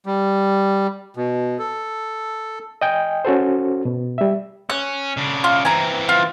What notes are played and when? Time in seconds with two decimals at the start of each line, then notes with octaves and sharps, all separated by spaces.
0.06 G3
1.17 B2
1.59 A4
2.81 D#5 G5 G#5
3.25 C#4 F#4 A4 C5
3.85 B2
4.18 G3 E5
4.70 C#4 F#6
5.17 C#3 D4
5.44 F4
5.65 E3 C4 G#5 A#5
6.09 F4